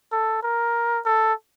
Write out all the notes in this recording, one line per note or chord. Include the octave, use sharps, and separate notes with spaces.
A4
A#4
A4